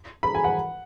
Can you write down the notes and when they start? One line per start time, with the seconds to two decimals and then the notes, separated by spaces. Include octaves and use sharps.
0.23 B5
0.35 G#5
0.44 F#5